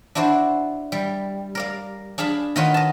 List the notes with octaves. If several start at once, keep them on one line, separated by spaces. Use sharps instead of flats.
D4 E4 F#4 C5 D5
G3
A#4 D5 F5
D4 G#4 F5 A5 B5
D#3 D#4 F4 F#4 B4 C#5
D#5 A5